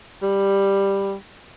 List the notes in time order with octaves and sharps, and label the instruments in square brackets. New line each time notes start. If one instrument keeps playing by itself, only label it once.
[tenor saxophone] G3